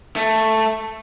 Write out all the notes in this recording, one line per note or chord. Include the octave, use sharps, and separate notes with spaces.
A3